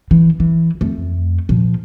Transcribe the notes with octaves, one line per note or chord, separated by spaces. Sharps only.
E3
E3
F2 A3
A#2 F3